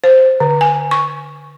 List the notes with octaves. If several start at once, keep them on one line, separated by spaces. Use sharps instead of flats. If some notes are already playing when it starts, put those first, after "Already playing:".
C5
D3
G#5
C#6